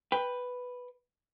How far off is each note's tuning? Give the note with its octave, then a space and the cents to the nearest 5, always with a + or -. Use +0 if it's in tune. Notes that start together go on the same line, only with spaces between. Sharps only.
B4 +0 G5 +10